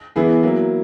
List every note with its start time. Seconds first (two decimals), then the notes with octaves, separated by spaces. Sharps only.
0.16 E3 B3 E4 G#4
0.43 F#3 A#3 E4